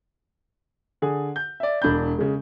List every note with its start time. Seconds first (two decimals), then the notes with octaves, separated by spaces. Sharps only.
1.02 D3 G#4
1.36 G6
1.60 D5 E5
1.82 E1 D4 B5 G6
2.18 C#3 G#3